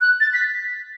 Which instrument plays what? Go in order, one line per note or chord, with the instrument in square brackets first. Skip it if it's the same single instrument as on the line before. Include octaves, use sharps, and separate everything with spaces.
[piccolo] F#6
A6
B6